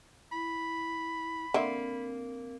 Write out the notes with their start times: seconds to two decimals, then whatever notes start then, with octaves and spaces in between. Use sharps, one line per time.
0.32 E4 B5
1.54 D3 A#3 C4 E5